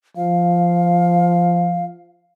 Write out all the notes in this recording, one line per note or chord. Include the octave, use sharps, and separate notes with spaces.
F3 F5